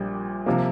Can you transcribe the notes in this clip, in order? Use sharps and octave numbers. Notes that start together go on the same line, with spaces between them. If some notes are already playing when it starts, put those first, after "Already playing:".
Already playing: A#1 A#2 G3
C3 F3 A#3